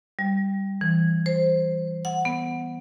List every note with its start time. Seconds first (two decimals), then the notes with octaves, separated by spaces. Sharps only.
0.19 G3
0.81 E3
1.26 C5
2.05 F#5
2.25 B3